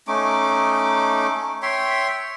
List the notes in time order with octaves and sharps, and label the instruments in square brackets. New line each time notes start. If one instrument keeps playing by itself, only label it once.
[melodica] A3 C#4 D#4 D6
C#5 E5 G5 C6